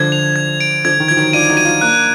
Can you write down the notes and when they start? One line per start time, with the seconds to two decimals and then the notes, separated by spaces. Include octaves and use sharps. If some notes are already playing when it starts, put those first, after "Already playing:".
Already playing: D3 F3 G#6
0.12 F7
0.36 G#6
0.61 D7
0.84 D3 F3 G#6
1.00 D#3
1.08 F3 G#6
1.17 D#3 F#3
1.33 D4 F4 D#7
1.49 D#4 F#4
1.57 D#7
1.65 D4 F4
1.81 A#3 D4 F#6